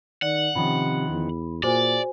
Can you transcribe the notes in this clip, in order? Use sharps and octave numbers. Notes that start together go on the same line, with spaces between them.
D#3 D5 F#5
C3 D#3 F3 C#4 B5
E2
A#2 F#4 G#4 C5 D5 G#5